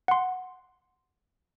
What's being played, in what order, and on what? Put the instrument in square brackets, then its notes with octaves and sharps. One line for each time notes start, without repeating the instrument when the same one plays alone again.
[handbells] F#5 C6